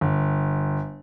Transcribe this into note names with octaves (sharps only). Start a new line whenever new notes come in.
G1